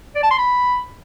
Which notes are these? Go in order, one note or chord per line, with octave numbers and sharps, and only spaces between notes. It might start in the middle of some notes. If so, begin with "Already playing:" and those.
D5
A5
C6
B5